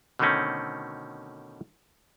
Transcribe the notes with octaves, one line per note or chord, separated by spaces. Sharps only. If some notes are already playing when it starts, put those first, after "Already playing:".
B2 D3 D#3 A3 C4 C#4